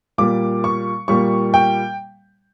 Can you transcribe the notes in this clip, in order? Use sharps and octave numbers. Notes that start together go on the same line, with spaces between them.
A#2 G3 A#3 D6
C#6
A#2 G3 A#3 C#6
G5